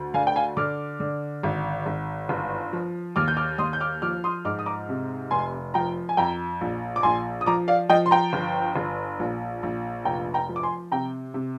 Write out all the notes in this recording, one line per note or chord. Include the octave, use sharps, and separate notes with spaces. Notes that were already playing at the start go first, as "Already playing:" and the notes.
Already playing: D2
D3 F5 G#5
G5
F5 G#5
D3 D6 F6
D3
G#1
G#1
G1
F3
D#2 D6 F6
G6
D6 F6
D#2 C6 D#6
G6
D6 F6
F3 D6 F6
C6 D#6
G#2 D6 F6
D#6
A#5 D6
C3
F1 G#5 C6
F3 G5 A#5
G#5
F2 G5 A#5
A#1
D6
A#1 G#5 C6
D#6
F3 A#5 D6
D5 F5
F3 D#5 G5
C6
G5 A#5
G1
G1
A#1
A#1
F1 G5 A#5
G5 A#5
F3
D6
G#5 C6
C3 G5 A#5
C3